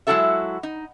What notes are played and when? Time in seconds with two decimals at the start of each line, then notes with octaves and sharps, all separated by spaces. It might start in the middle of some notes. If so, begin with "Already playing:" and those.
0.07 F#3 G#3 E4 F#4 A4 E5
0.63 D#4